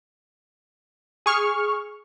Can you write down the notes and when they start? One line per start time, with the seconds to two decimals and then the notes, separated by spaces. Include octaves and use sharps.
1.26 G#4 C#6 F6